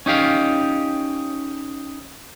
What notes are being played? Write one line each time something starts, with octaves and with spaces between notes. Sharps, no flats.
C#4 D#4 G4 F5